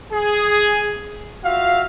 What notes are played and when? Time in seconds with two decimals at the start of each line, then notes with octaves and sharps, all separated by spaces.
0.13 G#4
1.44 F4 F#4 E5 F5